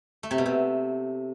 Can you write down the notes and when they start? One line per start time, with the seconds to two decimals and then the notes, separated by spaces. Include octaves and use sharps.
0.23 A3
0.31 C3
0.38 B2
0.46 C3